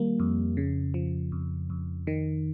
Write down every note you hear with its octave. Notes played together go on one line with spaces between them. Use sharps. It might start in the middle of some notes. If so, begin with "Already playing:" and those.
Already playing: D#3 G3 A#3
F2
C#3
F3
F2
F2
D#3